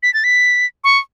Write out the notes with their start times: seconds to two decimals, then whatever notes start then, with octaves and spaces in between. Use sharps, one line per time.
0.03 B6
0.14 A6
0.24 B6
0.84 C#6